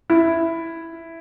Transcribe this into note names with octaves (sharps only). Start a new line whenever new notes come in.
E4